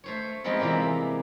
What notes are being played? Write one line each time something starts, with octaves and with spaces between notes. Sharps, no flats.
A3 C5 C#5
F3 G#3 B3 C4 D#4 F4
C3 E3 G3 G#3 A#3